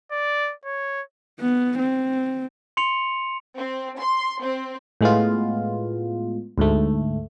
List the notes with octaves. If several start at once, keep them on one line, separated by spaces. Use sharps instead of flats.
D5
C#5
B3
C4
C6 C#7 F7
C4
C6
C4
A2 G#3 B3 F4
D2 G#2 A3